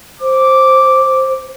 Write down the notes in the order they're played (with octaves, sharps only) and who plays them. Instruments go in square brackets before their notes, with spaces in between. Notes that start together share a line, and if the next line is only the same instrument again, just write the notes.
[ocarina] C5 [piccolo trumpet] D6